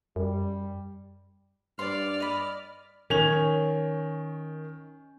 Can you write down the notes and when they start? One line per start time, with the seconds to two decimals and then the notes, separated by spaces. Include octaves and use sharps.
0.16 F#2 G3
1.79 G2 D5 C6 F6
2.20 D#5 B5
3.10 D#3 C#4 F7